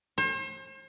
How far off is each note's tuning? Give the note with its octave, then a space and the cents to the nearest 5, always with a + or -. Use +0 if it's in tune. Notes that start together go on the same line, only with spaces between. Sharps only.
C5 +40